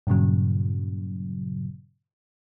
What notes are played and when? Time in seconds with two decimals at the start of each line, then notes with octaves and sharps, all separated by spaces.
0.07 G2 A#2 C#3 F#3